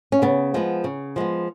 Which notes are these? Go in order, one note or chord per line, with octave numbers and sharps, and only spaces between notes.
C#4
C#3 B3
F3 G#3 B3
C#3
F3 G#3 B3